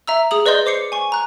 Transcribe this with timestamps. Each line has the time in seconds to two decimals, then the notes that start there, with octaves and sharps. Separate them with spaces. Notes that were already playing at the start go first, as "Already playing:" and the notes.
0.07 E5 A#5 E6
0.31 G#4 D#6 F#7
0.46 B4 D5 D#5 C6 G6
0.66 C5 D6 C7 C#7
0.92 G#5 C#6
1.12 A#5 F#6